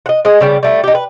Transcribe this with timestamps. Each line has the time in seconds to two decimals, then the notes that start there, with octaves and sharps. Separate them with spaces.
0.06 D#5 F#5
0.25 G#3 D#5
0.41 C#3 G3 B3
0.63 G3 A3 E4
0.84 D#4 G4
0.95 B4